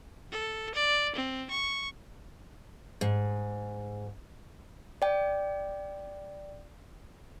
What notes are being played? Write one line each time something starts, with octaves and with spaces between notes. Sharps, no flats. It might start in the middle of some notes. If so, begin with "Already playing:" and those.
A4
D5
C4
C#6
G#2
D5 G5